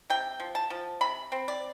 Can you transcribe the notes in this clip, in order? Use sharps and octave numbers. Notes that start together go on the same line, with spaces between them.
C3 G5
F3
A5
F3
C3 B5
C4
D5